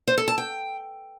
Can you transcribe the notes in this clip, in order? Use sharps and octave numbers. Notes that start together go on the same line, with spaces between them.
C5
A4
A5
G5